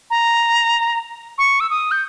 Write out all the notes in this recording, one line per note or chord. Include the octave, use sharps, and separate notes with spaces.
A#5
C#6
E6
D#6
G6